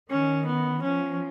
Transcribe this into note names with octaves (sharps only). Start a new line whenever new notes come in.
D#3 C#4
B3
F3 C#4